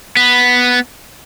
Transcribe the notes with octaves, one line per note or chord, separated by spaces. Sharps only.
B3